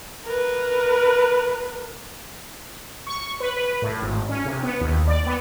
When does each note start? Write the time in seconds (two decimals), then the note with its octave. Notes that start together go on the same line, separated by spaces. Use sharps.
0.25 A#4 B4
3.07 C#6
3.40 B4
3.57 B4
3.82 A2
4.02 G#1
4.29 C#4
4.45 C3
4.63 B3
4.81 D#2
5.07 D5
5.26 B3